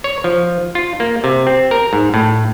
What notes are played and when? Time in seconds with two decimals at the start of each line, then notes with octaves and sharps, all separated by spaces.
0.04 C#5
0.24 F3
0.75 F4
1.00 A#3
1.24 C3
1.47 C4
1.71 A#4
1.93 G#2
2.14 A2